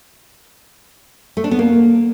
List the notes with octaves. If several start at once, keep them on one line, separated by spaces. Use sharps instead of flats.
A3
D4
B3
A#3